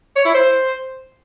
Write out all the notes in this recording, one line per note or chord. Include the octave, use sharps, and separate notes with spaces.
C#5
E4
C5